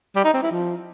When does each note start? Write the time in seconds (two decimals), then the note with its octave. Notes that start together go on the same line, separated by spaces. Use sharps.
0.15 G3
0.24 D#4
0.34 C4
0.43 E4
0.52 F3